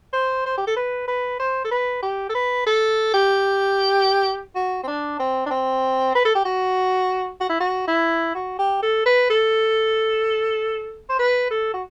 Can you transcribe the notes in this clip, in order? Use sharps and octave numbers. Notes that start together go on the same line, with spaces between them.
C5
C5
G4
A4
B4
B4
C5
A4
B4
G4
A4
B4
A4
G4
F#4
C4
D4
C4
D4
C4
B4
A4
G4
F#4
F#4
E4
F#4
E4
F#4
G4
A4
B4
A4
C5
B4
A4
F#4